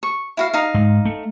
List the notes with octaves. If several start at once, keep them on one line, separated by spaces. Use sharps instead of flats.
C#6
E4 F#4 F5
D#4 F5
G#2
A3